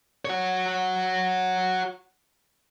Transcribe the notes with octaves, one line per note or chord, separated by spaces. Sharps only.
F#4 C#5